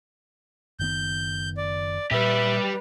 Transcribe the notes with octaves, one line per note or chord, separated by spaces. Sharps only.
F#1 D#3 B3 G6
D5
A#2 G3 G4 B4 E5